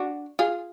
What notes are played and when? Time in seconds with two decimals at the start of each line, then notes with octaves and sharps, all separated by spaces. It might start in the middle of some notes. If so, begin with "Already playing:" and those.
Already playing: D4 F#4
0.39 F4 G#4